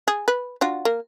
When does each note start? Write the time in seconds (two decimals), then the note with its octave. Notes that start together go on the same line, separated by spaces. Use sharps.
0.08 G#4
0.28 B4
0.61 D4 F4 F#4
0.85 A#3